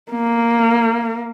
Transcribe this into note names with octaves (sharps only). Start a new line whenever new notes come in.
A#3